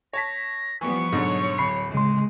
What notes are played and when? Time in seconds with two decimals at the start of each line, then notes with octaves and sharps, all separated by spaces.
0.13 C#5 A5 A#6 B6
0.81 E3 F3 G3 B3 C#6
1.12 G#2 B2 D3 F#3 C#5
1.58 D1 B5 C7
1.94 C#3 G#3 C6